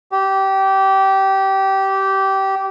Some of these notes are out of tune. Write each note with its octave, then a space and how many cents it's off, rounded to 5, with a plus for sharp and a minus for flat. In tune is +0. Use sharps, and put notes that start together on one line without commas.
G4 -20